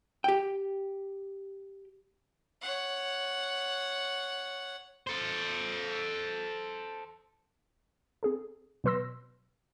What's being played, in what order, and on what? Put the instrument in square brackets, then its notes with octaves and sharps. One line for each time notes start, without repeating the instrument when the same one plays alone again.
[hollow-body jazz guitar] G4 G5
[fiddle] C#5 F#5
[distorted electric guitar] A4 C5
[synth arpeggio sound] C4 G#4 A4
B2 F#3 B4 C6 E6 A#6